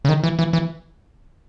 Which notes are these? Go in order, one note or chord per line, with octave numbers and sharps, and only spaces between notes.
C#3
D#3
E3
E3
E3